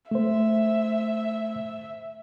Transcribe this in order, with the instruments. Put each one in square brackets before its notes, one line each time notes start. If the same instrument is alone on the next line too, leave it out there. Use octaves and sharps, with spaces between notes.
[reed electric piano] A3 C5 [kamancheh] E5